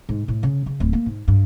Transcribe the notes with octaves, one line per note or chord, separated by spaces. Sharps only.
G#2
A2
C#3
C#3
D1
A#3
G#2
G2